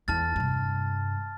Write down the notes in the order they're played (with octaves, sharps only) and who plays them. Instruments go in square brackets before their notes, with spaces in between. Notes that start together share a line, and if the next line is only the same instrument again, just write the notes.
[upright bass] E2 E4 [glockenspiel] A5 F6 A6
[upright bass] G2 C3